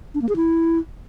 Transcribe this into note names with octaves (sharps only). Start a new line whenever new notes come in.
D4
A#3
G#4
E4